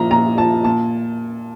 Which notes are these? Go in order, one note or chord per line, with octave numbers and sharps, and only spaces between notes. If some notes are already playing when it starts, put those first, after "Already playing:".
Already playing: A#2 F3 A#5
A#2 A#5
F3 A5
A#2 A5